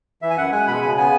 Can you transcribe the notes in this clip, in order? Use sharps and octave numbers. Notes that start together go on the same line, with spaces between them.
E3 E5
G#5
F#2 F#5
G#3 G#5
B2 B5
C#3 G#5
B3 G#5